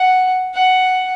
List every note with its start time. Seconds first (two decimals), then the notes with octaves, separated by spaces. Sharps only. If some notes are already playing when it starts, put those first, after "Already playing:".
Already playing: F#5
0.54 F#5